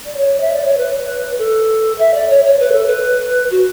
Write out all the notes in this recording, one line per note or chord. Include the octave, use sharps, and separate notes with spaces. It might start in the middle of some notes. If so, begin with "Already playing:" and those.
D5
C#5
E5
D5
C#5
B4
A4
E5
D5
C#5
C#5
B4
A4
B4
F#4